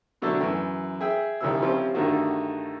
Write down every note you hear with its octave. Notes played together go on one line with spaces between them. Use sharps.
B2 D3 F#3 A3 D4 A4
F#2 E3
G#4 E5 G5
C#2 D#3 F3 G3 E4 E6
F3 G3 C4 C#4 E4 F4
G2 D3 D#3 A3 F#4